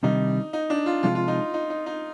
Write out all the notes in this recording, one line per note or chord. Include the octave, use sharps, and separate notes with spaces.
C3 D#3 G3 D4 D#4
D#4
D4
F4
C3 F3 G#3 D4 F4
F4
D#4
D#4
D#4
D#4